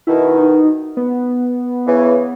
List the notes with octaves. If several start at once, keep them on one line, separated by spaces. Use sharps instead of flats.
B2 D#3 E4
D#4
B3
C#3 E3